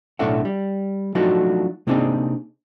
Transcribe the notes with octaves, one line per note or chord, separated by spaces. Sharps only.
B1 A2 D4 A4 E5 F#5
G3
F3 F#3 A3 D4 D#4 F#4
C3 A#3 C4 D4 D#4 G#4